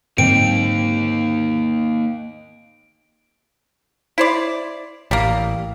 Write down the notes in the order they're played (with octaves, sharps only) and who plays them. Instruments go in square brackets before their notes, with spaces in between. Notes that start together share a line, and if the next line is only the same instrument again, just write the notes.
[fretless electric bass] G#2 D3 F#3 [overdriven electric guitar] A#3 D#4 [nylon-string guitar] C4 [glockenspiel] D7
[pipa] E4 C5 D5
[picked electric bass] A1 [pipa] G3 A#3